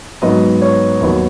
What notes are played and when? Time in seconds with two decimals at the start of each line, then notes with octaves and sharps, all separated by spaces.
0.22 G#2 F#3 B3 D#5
0.61 C#5
1.00 D#2 D#3 F#3 B3